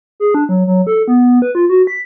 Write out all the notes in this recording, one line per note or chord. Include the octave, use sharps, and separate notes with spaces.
G#4
D4
F#3
F#3
A4
B3
B4
F4
F#4
B6